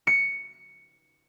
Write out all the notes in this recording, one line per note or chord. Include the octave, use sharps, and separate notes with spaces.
C#7